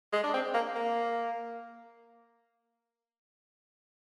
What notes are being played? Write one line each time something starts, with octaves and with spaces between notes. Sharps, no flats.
G#3
D4
C4
A#3
A#3